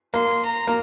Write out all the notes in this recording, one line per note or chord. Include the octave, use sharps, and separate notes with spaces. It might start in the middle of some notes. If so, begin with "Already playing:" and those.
A#3 C6
A#5
A#3